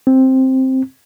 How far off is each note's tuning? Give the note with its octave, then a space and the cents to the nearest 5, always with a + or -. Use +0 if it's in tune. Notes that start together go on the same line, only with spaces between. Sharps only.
C4 +5